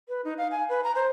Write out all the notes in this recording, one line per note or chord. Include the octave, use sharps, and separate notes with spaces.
B4
D#4
F5
G#5
B4
A#5
C5